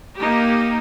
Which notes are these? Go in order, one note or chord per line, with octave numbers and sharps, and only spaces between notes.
A#3 D#4 G4